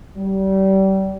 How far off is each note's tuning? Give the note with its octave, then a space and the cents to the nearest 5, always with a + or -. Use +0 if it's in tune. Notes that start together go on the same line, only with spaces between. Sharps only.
G3 -30